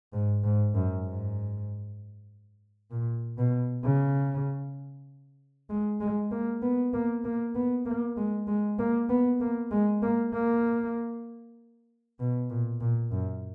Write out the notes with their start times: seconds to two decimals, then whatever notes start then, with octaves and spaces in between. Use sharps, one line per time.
0.13 G#2
0.44 G#2
0.75 F#2
1.06 G#2
2.91 A#2
3.38 B2
3.84 C#3
5.70 G#3
6.00 G#3
6.31 A#3
6.62 B3
6.93 A#3
7.24 A#3
7.55 B3
7.86 A#3
8.17 G#3
8.47 G#3
8.79 A#3
9.09 B3
9.41 A#3
9.71 G#3
10.02 A#3
10.33 A#3
12.19 B2
12.50 A#2
12.81 A#2
13.12 F#2